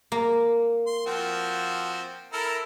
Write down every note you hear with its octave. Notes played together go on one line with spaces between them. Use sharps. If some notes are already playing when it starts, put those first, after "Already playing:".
A#3
C6
F3 C4 F#4
E4 A4 A#4